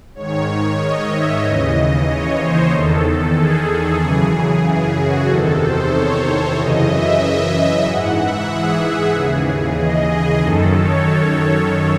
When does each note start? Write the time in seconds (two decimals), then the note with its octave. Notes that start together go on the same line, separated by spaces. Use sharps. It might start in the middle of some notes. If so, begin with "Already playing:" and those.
0.15 G#2 D#3 C#5
0.79 D#5
1.11 E5
1.43 D#2 C#3 E3 D#5
2.07 C#5
2.39 C5
2.71 E2 D#3 A4
3.35 G#4
4.00 F#2 C#3 E3
4.64 G#4
4.96 F#4
5.28 E2 C3 D#3 A4
5.60 C5
5.92 C#5
6.57 F#2 C#3 E3 D#5
6.88 E5
7.85 G#2 E3 F#5
8.18 E5
8.50 G#4
9.14 D#2 C#3 E3 G#4
9.78 D#5
10.10 G#4
10.42 F#2 D#3 A4
10.75 C#5